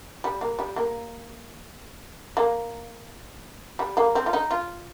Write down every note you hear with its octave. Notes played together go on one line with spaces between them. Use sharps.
G3
A#3
G3
A#3
A#3
G3
A#3
C4
F4
D#4
F4